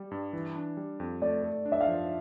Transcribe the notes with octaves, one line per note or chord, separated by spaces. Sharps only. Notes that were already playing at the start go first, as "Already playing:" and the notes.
Already playing: G3
G2
E3
D4
G3
F2
A3 D5
A4
D4
E5
F5
F3